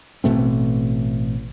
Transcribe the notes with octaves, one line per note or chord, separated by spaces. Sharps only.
A1 B2 A3 C4